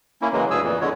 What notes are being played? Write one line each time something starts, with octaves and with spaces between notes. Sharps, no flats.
A#3 C#4 E4
C#3 E3 F#3 G#3 A#3
D2 G2 G#4 G#5 E6
F2 A#2 E3
E2 D3 G#3 C#5